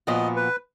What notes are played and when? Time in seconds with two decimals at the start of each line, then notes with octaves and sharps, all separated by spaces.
0.07 A#2 F3 B3 F#4 D#5
0.36 B4